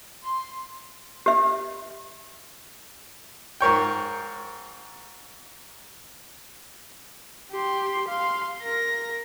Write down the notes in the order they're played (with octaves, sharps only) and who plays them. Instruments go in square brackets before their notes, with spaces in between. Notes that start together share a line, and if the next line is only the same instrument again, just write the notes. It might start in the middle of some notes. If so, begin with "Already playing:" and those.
[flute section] C6
[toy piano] G4 E5
[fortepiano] G#2 A#4 C#5 G5
[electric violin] G4 C6
F5 C6
A#4 A#6